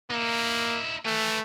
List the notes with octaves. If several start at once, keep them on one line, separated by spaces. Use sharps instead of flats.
A#3 D#4 E4
A3 B4 G#5